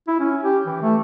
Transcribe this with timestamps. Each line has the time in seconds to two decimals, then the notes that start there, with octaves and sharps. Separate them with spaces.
0.08 E4
0.20 C#4
0.43 G4
0.66 E3
0.82 A3